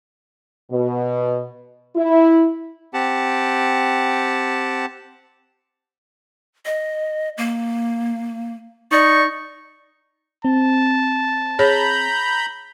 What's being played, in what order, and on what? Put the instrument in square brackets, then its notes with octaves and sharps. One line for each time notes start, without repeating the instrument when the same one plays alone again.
[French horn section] B2
E4
[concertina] C4 G4 F#5 A5
[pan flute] D#5
A#3
[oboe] D#4 [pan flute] D5 [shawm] C#6
[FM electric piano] C4 [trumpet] A5
[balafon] G#4 C#5 [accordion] A#5 B5 G6